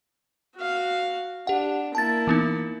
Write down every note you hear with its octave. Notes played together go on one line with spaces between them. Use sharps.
F#4 F5
D4 G4 F#5
A#3 E4 A5 A6
E3 B3 D#4